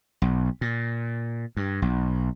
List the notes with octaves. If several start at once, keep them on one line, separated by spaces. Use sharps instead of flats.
B1
A#2
G2
B1